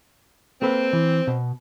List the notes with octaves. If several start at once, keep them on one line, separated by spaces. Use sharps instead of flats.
A#3 C4 A4 B4
E3
B2